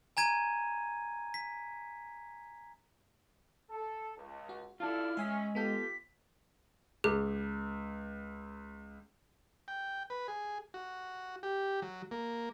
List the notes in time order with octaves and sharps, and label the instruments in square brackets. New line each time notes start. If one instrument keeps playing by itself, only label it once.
[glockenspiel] G#5 A#5 G#6 D#7
B6
[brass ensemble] A4
C#2
[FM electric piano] F#4
[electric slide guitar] E4 F4 [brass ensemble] A4 D5 A5 [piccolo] F6
[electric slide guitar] G#3 [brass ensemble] C#4 [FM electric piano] E5 G#5 B6
[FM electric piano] B3 A4 G6 [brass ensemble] F4 G4 [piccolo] B6
[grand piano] C#2 [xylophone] G#4
[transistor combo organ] G5
B4
G#4
F#4
G4
F#3
A#3